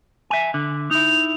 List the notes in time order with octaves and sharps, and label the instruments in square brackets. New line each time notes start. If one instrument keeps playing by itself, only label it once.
[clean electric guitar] E5 G#5
D3
[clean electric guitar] D#4 E4 [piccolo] F7